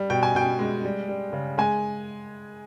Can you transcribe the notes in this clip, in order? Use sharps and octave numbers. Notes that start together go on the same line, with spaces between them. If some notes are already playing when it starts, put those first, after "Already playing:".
Already playing: G3
B2 G5
G#5
B2 G5
G#3
G3
G3
C#3
G#3 G#5